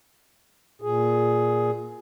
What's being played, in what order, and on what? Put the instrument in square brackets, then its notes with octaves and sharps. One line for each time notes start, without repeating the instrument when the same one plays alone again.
[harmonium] A#2 G#4